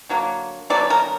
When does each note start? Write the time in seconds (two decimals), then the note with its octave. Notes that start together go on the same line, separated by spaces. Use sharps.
0.09 D3 F#3 A#3
0.70 D3 F#3 B3 D5
0.90 A#4